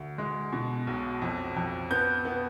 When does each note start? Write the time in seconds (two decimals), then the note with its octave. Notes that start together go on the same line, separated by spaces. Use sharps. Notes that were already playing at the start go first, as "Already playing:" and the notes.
Already playing: D2
0.18 G#3
0.52 B2
0.87 B1
1.22 F2
1.56 F2
1.91 B3 G6
2.25 B3